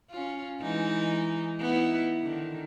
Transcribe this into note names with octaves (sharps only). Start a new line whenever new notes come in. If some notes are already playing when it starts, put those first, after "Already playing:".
C#4 F4
E3 G#3 D#4
B3 D#4 E4
D3 D#3